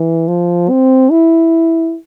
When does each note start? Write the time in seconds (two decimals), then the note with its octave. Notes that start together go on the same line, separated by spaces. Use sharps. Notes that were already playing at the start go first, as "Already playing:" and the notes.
Already playing: E3
0.28 F3
0.70 C4
1.11 E4